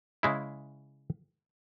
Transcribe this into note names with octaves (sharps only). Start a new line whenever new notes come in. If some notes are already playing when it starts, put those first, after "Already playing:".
C#3 G#3 E4